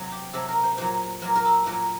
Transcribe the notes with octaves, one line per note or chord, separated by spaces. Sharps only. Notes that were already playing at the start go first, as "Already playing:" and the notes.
Already playing: C3 F#3
G4
C3 F#3 A4
A#4
C5
A#2 F#3 C5
A#2 F#3 A#4
A#4
A4
A#2 F#3 A#4